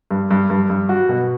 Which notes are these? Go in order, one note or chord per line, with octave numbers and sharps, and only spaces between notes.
G2
G2
G2
G2
F#4
B2